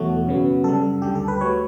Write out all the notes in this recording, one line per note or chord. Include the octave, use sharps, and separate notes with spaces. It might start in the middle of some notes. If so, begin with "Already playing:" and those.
Already playing: E2 B2 F#3 A3 F#4
F#2 C#3 F#3 B3
F#2 C#3 G3 A4
D2 D3 G3 G4
A4
B4
F#3 A3 C#5